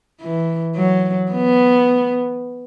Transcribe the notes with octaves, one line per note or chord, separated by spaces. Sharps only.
E3
F#3
B3